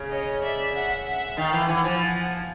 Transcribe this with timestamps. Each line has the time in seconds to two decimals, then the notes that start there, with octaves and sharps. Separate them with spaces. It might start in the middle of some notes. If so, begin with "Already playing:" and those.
Already playing: C#3
0.10 C#5 D#5
0.42 D5 E5
0.73 E5 F#5
1.05 E5 F#5
1.37 D#3 F5 G5
1.53 E3
1.68 E3 F#5 G#5
1.84 F3
2.00 F#5 G#5